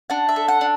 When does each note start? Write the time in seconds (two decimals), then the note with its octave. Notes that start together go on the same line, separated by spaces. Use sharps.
0.10 D4 F#5
0.29 E5
0.36 A4
0.48 F#5
0.61 D4